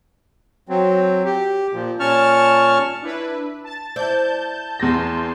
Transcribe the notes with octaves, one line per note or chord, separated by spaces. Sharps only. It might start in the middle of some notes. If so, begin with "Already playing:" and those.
F#3 C4
G4
A#2 F3
A#2 C#4 A5 C#6 F6
D4 E4 B4
A5 A6
E4 C5 D5 A5 G6
E2 A5 C6 G6 A#6